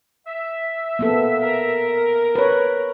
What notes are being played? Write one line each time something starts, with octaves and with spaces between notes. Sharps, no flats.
E5
A#3 B3 A4
A#4
B4 C#5